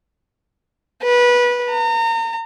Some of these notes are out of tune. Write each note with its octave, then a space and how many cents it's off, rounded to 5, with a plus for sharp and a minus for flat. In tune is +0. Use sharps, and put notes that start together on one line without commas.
B4 -20
A#5 -35